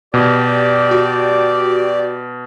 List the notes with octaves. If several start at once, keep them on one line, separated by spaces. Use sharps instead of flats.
B2 G4 D5
F#4